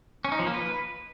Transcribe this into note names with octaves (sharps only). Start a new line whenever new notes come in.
C#4
D#4
F3
A#3
B4